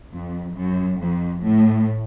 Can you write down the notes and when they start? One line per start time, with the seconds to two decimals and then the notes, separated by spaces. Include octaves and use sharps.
0.12 F2
0.56 F#2
1.00 F2
1.44 A2